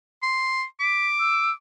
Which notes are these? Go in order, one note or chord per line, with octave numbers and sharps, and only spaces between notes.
C6
D6 B6
E6